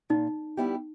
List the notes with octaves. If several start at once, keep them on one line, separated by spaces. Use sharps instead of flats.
A#2 D#4
G3 B3 E4 G4